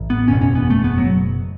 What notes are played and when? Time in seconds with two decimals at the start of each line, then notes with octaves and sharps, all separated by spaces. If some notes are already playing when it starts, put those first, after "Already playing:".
Already playing: A1 A2
0.10 B3
0.28 F#1 E2 B2 C#4
0.42 C#4
0.55 B3
0.70 A3
0.84 B3
0.98 F#3